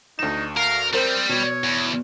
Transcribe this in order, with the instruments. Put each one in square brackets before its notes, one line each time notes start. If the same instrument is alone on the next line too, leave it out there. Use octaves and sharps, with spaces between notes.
[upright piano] D2 E7 [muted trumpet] D#4
[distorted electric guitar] A#4 [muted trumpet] F5
[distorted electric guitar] G3 [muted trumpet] C4 [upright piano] A#4 C5
[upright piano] B2 [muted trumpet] C#5
[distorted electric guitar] E2